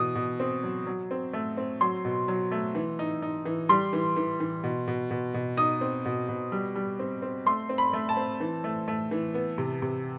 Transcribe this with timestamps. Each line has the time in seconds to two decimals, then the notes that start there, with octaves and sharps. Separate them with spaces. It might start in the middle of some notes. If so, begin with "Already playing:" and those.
Already playing: B2 E3 D#6
0.15 B2
0.40 C4
0.63 F#3
0.86 F#3
1.11 C4
1.33 A3
1.57 C4
1.81 F#3 C6
2.05 B2
2.28 F#3
2.52 A3
2.75 E3
2.99 D#4
3.22 D#4
3.45 E3
3.69 G3 C6
3.93 E3
4.16 E3
4.40 E3
4.64 B2
4.88 B2
5.11 B2
5.34 B2
5.57 D#4 D#6
5.81 C4
6.05 B2
6.29 B2
6.52 G3
6.75 G3
6.99 C4
7.22 C4
7.46 A3 C6
7.69 C4
7.78 B5
7.93 A3
8.09 A5
8.17 C4
8.40 E3
8.64 A3
8.88 A3
9.11 E3
9.34 B3
9.58 C3
9.82 C3